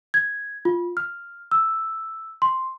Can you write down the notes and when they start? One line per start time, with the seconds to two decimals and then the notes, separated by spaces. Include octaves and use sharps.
0.14 G#6
0.65 F4
0.97 F6
1.51 E6
2.42 C6